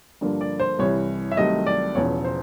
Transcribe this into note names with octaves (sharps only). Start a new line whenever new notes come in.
G2 D3 F3 A#3
D5
C5
C2 C3 E3 C#5
E5
C2 C3 D#3 F#3 A3 D#5
D5
E1 E2 C#3 F3 C#5
C5